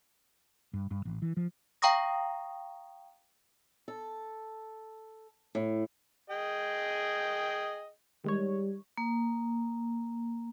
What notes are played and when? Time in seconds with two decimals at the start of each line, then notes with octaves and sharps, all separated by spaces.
0.73 G2
0.91 G2
1.05 A1
1.22 E3
1.37 F3
1.82 F5 G5 A#5 C#6 D#6 A#6
3.88 A4
5.55 A2
6.30 G#4 D#5 G5
8.24 D#3 G3 G#3 C#5
8.97 A#3